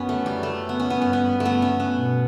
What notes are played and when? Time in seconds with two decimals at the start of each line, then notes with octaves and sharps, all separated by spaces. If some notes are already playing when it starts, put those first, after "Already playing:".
Already playing: F#2 B3 C#4
0.09 A3
0.26 G3
0.43 A3
0.69 B3
0.80 C#4
0.90 G2 B3
1.02 C#4
1.13 B3
1.40 A3
1.45 B3
1.62 C#4
1.80 B3
1.96 B2